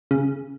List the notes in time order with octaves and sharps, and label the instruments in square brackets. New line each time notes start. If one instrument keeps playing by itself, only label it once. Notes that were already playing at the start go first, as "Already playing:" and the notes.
[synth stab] C#3